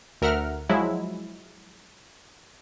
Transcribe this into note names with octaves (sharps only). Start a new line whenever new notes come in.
D2 A#4 E5 F#5 F6
F3 F#3 G#3 E4